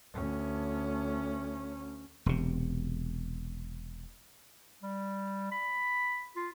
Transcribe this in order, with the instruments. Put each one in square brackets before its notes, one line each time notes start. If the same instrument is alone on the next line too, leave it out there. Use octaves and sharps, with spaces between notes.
[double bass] D2 C#4
[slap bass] E1 C3
[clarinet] G3
B5
F4